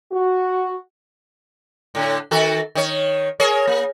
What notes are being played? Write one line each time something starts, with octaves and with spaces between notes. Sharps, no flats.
F#4
A2 D3
D#3 F#4 A4
D#3 C#5
G#4 A#4 C#5
A#3